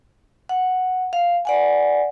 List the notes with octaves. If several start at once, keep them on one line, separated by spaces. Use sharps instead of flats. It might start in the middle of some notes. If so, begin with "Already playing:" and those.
F#5
F5
D5 F#5 G#5